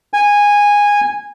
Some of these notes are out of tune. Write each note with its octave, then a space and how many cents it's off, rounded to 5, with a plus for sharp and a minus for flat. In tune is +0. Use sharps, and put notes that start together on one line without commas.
G#5 -15